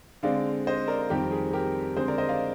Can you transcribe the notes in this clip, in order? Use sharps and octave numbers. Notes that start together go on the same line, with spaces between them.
D3 G#3 C4 D5 F5
C5 D#5
A#4 D5
F2 D#3 G3 C4 G4 A#4
G#4
G4 A#4
D3 G#3 C4 G#4 C5
A#4 D5
C5 D#5
D5 F5